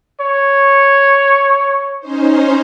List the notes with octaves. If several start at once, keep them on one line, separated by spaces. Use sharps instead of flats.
C#5
C#4 D#4 C5